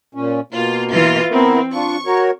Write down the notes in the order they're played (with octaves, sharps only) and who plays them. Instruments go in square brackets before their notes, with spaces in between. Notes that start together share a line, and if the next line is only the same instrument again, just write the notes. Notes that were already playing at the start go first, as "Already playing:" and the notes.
[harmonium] A#2 C#4
[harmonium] B2 A#3 [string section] F4
[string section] E3 F4
[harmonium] B3 E4 A#4 [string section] C4
[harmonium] D4 F4 [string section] C#6
[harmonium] F#4 A#4 C#5